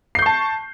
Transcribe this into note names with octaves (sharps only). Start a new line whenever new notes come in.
A5 C#6 G6 C7